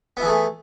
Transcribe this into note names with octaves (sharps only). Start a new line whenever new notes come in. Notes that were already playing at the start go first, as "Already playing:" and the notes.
E3 A3 B3 E4 G#4